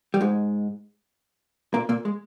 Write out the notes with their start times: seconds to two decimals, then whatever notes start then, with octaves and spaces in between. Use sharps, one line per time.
0.14 G3
0.21 G#2 G#3
1.74 A#2 A#3
1.89 A#2 A#3
2.05 G#3